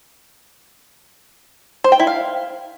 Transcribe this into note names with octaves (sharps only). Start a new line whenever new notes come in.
C5
G5
E4
F5